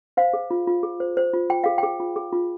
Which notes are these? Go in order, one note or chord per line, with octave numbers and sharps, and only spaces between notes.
C5 F5
G#4
F4
F4
G#4
C5
C5
F4
F4 G5
G#4 F5
G#4 G5
F4
G#4
F4